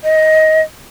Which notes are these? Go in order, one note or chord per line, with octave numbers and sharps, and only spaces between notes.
D#5